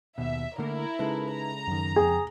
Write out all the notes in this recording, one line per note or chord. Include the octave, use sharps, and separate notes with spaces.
D#2 B2 E5
D3 A3 A#3 E4 A#4
C#3 G#3 D#4 A4 B4
A#5
F#2 D#3
F2 G#4 G5